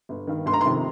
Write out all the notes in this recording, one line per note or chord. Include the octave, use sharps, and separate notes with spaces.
G1
G2 D#3
G1 C6
A#5
C6
F2 C3 D#3